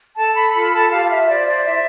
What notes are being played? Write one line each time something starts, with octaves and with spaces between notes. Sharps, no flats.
A4 A5
B5
F4 B5
A5
G4 F5
F5
E5
C5 D5
D5
E4 E5